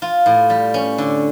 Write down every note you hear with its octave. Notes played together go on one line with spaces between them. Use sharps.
F4
A2
G3
C#4
D3